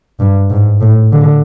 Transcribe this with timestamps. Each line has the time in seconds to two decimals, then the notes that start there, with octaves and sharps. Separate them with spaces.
0.20 G2
0.50 G#2
0.81 A2
1.13 D3